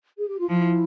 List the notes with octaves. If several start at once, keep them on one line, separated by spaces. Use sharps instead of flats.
G#4
G4
F4
F3 E4